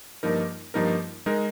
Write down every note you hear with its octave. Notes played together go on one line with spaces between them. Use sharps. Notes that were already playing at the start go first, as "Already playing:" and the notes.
G2 F3 A#3 D#4 A#4
G2 F3 A#3 D#4 A#4
G#3 D#4 A#4